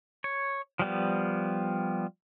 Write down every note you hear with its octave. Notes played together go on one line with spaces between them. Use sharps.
C#5
F3 G3 B3